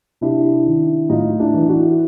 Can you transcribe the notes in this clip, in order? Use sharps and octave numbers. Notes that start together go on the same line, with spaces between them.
C3 D4 E4
D#3
A2 D#4 F4
D4 E4
E3
E4 F#4